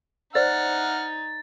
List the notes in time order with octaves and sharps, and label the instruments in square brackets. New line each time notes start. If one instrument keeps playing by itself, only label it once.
[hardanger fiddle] D#4 [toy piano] C5 D5 [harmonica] F#5 F6 [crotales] A6